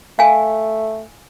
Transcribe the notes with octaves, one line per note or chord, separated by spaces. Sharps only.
A3 F5 G#5